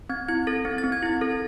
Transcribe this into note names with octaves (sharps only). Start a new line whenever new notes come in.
C4 G#6
E4 G#6
A4 A6
C4
A6
C4
G#6
E4 A6
A4